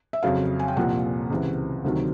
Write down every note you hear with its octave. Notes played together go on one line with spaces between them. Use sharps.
E5
F2 C#3 F#3 F5
G#5
G5
C2 A#2 F3 F#5
C#2 C3 E3
D2 C3 D#3 F#3